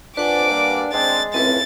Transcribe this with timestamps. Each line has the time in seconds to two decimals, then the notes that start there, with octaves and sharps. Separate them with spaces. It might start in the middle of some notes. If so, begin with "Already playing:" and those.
0.17 F2 D4 B4 D5 F#5 G#5 D6
0.50 G3 A#3
0.93 G#3 C4 D4 A6
1.34 C#2 F#2 A2 C4 B4 A6